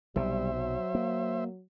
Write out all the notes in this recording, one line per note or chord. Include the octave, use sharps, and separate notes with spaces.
B1 C3 G3 C5 E5
F#3
A#3